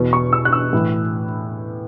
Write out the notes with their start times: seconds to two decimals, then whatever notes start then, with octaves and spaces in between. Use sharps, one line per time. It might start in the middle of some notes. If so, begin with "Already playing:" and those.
Already playing: E2 B2
0.13 C#6
0.33 E6
0.45 F#6
0.53 E6
0.73 A2 E3